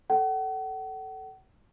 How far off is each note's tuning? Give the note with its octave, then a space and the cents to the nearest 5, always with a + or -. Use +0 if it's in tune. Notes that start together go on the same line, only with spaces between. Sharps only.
A4 +0 F#5 +40